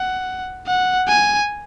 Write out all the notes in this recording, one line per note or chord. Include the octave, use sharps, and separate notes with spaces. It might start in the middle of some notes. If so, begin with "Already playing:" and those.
Already playing: F#5
F#5
G#5